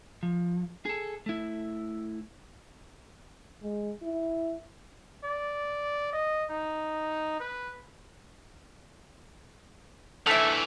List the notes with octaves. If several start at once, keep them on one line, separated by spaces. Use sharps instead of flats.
F3
G#4 A4
A3 E4
G#3
E4
D5
D#5
D#4
B4
D3 E3 A3 E5 E6